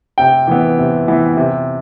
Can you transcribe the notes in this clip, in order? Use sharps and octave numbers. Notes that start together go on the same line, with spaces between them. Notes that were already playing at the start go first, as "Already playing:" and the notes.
C3 G5
E3 B3
C3
E3 B3
C3